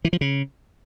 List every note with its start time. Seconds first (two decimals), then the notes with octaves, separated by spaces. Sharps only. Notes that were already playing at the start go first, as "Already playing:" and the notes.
0.05 E3
0.13 F3
0.21 C#3